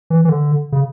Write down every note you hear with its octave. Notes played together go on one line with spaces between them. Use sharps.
E3
E3
D3
C#3